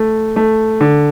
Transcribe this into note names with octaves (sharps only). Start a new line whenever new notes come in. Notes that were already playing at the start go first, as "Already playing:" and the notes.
Already playing: A3
A3
D3